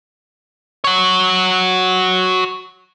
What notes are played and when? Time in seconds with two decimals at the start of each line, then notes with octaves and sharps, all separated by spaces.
0.84 F#4 C#5